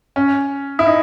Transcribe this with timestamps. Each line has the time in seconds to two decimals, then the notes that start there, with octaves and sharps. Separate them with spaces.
0.16 C#4
0.79 E4
0.86 D#4